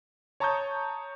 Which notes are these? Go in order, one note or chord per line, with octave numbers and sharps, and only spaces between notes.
C#5 A5 A#5 C#6 D#6 G6